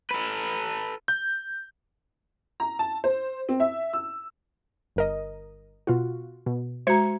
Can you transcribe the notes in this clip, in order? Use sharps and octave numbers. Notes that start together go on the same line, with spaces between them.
A4 B4
G6
A#5
A5
C5
C4
E5
E6
G1 A#4 D#5
B2 F4 F#4
B2
G#3 F#4 C5 A#5 G#6 C#7